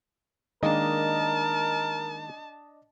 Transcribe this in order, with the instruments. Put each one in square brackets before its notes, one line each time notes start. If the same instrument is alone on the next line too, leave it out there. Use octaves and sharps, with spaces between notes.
[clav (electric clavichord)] D#3 G#3 A#3 [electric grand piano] D4 D#5 [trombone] A#4 [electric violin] A5